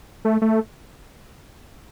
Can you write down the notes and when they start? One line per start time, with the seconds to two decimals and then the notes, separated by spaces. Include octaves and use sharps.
0.25 A3
0.42 A3